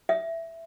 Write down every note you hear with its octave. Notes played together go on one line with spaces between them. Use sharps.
E5